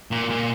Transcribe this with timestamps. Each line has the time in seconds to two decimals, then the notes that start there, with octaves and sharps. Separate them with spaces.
0.11 A#2
0.30 A#2